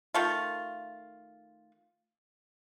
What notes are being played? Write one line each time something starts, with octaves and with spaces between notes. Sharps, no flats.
D#3 A3 F4